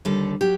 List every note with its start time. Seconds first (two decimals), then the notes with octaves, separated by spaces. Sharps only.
0.05 D#2 D3 G3 A4
0.41 F#3 G4